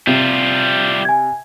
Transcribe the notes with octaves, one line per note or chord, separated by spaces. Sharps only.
C3 G3 F4
G#5 G#6